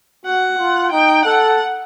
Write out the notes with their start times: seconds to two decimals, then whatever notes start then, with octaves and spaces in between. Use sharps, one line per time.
0.24 F#4 F#5
0.58 F4
0.92 D#4 G5
1.25 A4 F#5